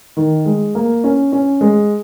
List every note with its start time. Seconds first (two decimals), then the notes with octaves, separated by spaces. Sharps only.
0.17 D#3
0.45 G#3
0.75 A#3
1.04 C#4
1.32 C#4
1.61 G#3